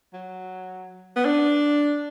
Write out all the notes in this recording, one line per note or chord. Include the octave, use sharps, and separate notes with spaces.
F#3
B3
D4